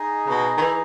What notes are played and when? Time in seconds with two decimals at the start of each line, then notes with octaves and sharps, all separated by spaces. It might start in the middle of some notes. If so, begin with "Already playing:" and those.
Already playing: D#4 G#4 D#5
0.26 C#3
0.30 B2
0.58 D#3
0.61 E3